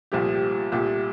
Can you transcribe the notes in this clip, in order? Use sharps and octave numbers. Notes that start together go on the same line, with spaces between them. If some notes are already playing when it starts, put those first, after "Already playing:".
C2 A#2 F3 A3 G4
G4
C2 A#2 A3 G4